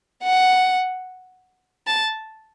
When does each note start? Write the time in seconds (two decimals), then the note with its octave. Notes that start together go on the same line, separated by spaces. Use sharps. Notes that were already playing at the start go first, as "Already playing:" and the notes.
0.23 F#5
1.87 A5